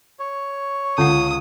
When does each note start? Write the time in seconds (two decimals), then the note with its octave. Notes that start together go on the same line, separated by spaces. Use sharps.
0.19 C#5
0.98 C#2 D3 F#5 D#6